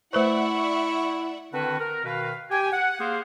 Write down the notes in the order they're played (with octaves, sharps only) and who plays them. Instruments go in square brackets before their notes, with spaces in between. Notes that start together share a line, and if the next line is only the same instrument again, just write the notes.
[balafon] A3 B4 C5 [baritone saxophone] E4 [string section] D5 E5 F#5 [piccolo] C#6
[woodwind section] D3 D#3 C4 D4 F#4 B4
A#4
B2 D#3 B4 F5
G4 G5 G#5
F#5
A#3 G#4 C5 F5